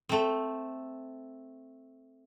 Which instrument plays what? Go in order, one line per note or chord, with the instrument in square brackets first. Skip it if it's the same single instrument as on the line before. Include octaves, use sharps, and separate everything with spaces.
[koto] A3 C4